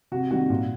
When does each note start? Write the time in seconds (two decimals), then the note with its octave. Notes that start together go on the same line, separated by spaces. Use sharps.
0.12 C3 F#4
0.31 D#3 G3 F#4
0.50 A#2